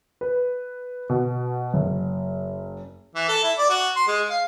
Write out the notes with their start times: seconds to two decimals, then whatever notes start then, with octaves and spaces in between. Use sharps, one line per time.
0.21 B4
1.09 B2
1.74 F#1
3.15 E3
3.28 A4
3.43 E4
3.58 D5
3.70 F#4
3.96 C6
4.07 G#3
4.30 F5